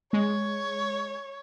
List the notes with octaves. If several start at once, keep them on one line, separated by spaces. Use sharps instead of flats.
G#3 C#5